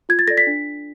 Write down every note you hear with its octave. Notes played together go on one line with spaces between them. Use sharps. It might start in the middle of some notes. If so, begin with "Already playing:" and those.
F4 G#6
A6
A4 D5 A#6
B6
D4